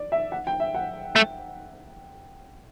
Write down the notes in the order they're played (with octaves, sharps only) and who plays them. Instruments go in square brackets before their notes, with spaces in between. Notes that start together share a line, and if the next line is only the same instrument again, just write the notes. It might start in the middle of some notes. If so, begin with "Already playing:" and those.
Already playing: [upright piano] D5
E5
F#5
G5
E5
F#5
[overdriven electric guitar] A3